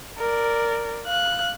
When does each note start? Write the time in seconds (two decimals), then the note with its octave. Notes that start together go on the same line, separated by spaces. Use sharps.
0.18 A#4 D5
1.05 F5 F#6